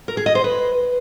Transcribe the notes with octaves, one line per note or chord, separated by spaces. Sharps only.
A#4
G#4
D#5
C5
B4